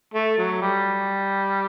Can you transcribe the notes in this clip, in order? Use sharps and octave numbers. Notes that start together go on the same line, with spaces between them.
A3
F#3
G3